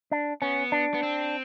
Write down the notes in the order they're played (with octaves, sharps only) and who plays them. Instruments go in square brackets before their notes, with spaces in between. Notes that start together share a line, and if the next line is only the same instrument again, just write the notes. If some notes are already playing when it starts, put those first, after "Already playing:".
[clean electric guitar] D4
[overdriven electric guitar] B3 [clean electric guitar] C#4
[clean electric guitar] D4
[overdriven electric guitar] B3
C4